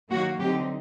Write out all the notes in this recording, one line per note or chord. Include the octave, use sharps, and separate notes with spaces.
D#3 F#3 A#3 F#4
D3 F#3 C4 D#4 G4